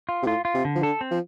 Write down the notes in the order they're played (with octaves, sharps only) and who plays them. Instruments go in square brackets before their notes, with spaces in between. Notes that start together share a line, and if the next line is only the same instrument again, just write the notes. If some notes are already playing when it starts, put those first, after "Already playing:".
[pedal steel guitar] F4
[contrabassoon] C3
[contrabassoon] A2 [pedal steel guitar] F4
[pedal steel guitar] F4
[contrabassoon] C3
[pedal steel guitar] D3
[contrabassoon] F3
[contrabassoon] D3 [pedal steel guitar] A4
[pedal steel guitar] C4
[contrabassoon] F3